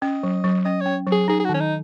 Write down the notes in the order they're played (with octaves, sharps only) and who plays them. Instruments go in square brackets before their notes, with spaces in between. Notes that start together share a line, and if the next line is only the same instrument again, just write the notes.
[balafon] C#4 [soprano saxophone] D#5
[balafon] F#3
F#3
[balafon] C#4 [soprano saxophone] D#5
[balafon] C#4 [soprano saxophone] C#5
[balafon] F#3
[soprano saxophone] G#4
[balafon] D#4 [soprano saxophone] G#4
[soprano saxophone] G#4
[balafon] D#3 [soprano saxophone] F#4
[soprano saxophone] C#4
D#4